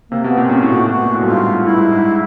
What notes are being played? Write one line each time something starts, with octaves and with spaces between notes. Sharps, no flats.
C3 A#3
B2 B3
A#2 C4
A#2 C#4
A2
F#4
A#2
B2 F#4
A#2
A2
G2
G#2 F4
G2 E4
G#2
G#2